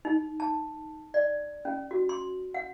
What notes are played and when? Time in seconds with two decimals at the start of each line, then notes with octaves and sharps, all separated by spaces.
0.05 D#4
0.40 A5
1.14 D5
1.65 C#4
1.91 F#4
2.09 C6
2.54 F#5